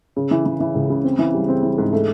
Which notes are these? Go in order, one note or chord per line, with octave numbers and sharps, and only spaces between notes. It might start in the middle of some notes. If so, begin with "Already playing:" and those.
C#3
E3
E3
E3
C#2
C#3
C4
E3
G3
C4
E3
G#2
A3